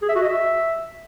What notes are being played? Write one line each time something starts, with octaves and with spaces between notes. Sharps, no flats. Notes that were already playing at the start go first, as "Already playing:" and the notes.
G#4
E5
F#4
D#5
E5